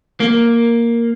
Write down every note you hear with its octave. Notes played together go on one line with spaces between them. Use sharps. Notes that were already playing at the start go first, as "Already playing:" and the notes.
A#3